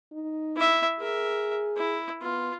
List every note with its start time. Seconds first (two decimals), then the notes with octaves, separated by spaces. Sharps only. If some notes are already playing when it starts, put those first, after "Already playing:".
0.13 D#4
0.56 E4 E5
1.00 G#4 A#4 E5
1.77 E4
2.22 B3 F4